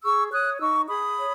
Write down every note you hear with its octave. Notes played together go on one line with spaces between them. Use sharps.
G#4 C#6 E6
C#5 D#6 F#6
D#4 C#6 E6
G#4 B5 D#6
C#5